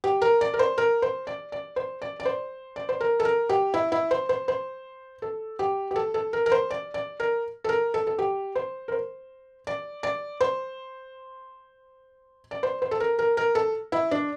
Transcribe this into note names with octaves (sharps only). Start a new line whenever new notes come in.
G4
A#4
D5
A#4
C5
A#4
C5
D5
D5
C5
D5
D5
C5
D5
C5
A#4
A4
A#4
G4
E4
E4
C5
C5
C5
A4
G4
G4
A4
A4
A#4
A#4
C5
D5
D5
A#4
A4
A#4
A4
A4
G4
C5
A#4
C5
D5
D5
C5
D5
C5
C5
A4
A#4
A#4
A#4
A4
E4
D4